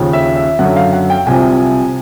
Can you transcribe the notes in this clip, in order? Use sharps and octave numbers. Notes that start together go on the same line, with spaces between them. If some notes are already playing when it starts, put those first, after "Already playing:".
Already playing: D#2 C#3 F3
E5
E5
F#2 D3 F#3 F#5
F5
F#5
G5
C2 C3 F3 G#5